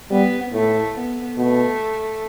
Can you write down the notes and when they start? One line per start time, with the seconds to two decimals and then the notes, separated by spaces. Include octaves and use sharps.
0.10 G3 B3
0.53 A2 A3
0.95 B3
1.36 B2 A3